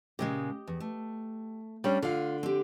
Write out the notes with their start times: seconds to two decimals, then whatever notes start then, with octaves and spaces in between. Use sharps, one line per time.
0.19 A#2 C#3 G#3 G4 D#5
0.67 E2
0.80 A3
1.84 G3 C#4 D4
2.02 D3 F4 F5
2.43 C4 G4